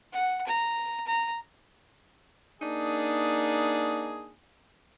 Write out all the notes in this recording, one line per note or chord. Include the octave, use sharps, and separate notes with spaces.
F#5
A#5
A#5
A#3 D4 D#4 G#4